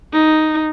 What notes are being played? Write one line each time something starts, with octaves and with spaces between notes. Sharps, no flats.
D#4